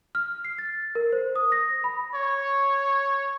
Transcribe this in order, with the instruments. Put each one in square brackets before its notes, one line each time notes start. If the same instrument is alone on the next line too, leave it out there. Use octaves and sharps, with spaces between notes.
[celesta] F6
C7
A6
A#4
C5
D#6
A#6
B5
[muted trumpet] C#5